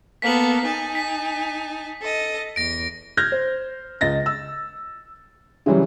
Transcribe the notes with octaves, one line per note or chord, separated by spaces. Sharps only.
A#3 B3 A4 B6 F#7
D#4 G#5 A5
B6
A4 D#5
E2 A#6 D7
F6 G6 G#6 A#6
C5
C#2 D#5 A6 A#6
E6
C#3 E3 F#3 G3